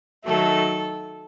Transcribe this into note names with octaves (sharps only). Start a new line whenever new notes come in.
D#3 F#3 A3 A4